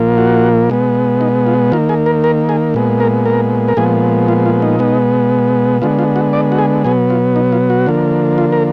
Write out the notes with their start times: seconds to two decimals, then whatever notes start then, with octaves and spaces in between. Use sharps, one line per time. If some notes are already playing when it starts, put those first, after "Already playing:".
Already playing: A#2 F3 A#3
0.18 F#4
0.70 B2 G#3 B3
1.21 D#4
1.47 F4
1.72 D#3 A#3 F4
1.89 G#4
2.06 A#4
2.24 A#4
2.49 G#4
2.74 A#2 G#3 B3
3.00 A#4
3.26 A#4
3.68 A#4
3.77 A#2 F3 G#3 B3 G#4
4.28 F4
4.46 F4
4.62 D#4
4.79 B2 G#3 B3
5.82 D3 G#3 B3 F4
5.99 F4
6.16 F#4
6.33 D5
6.52 F#4
6.58 G#4
6.84 B2 F#3 B3 G#4
7.10 F4
7.36 D#4
7.52 F4
7.70 F#4
7.86 D3 F3 A#3
8.38 F4
8.52 A#4